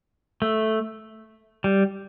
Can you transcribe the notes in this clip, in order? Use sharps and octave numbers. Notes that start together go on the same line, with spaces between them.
A3
G3